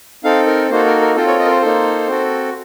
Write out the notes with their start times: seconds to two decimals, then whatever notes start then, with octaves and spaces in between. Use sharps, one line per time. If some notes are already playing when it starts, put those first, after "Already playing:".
0.24 C4 D#4 A4 F5
0.47 A#4
0.70 A#3 D#4 F#4 A4 C5
0.86 A#4
1.01 A#4
1.16 C4 F4 A4 C5
1.28 C#5
1.39 D#5
1.46 A#4
1.50 C5
1.62 A#3 D#4 A4
2.08 C4 F#4 A4